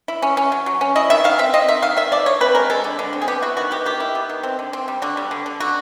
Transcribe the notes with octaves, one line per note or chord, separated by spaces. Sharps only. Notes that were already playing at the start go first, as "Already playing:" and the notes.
E4
C#4
C#4
F#3
F#3
C#4
E4 D#5
D#3 E5
D#3 F5
C4 E5
C4 D#5
D#3 E5
D#3 F5
D#3 E5
F3 D5
D3 C#5
C4 B4
G#3 A#4
G#3 A4
D3
D3
C4
G#4
B3 G4
E4 F#4
D#3 F#4
B3 G4
D#3 G4
E4
B3
D#3
C4
D3
C4
G3
D3 F#4
G3
D3
D3
D3 F#4